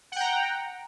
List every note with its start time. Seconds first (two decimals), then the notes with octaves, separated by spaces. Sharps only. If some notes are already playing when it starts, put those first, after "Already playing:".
0.12 F#5
0.16 G5
0.20 A#5